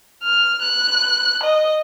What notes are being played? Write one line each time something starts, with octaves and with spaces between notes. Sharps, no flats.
F6
F#6
D#5